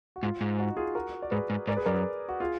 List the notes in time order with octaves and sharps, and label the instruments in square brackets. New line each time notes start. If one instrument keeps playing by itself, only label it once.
[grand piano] F#4
[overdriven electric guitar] G#2 [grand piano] F4
[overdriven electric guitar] G#2
[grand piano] D#4 F#4
F4 G#4
F#4 A#4
D5
[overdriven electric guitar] G#2 [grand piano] G#4 B4
[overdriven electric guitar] G#2
[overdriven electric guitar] G#2 [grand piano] A#4 D5
[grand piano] G#4 B4
[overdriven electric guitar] F#2 [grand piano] A#4 D5
[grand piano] G#4 B4
F#4
F4 G#4